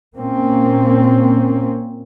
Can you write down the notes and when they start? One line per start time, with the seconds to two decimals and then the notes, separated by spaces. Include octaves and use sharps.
0.16 A#2 A#3 C4 C#4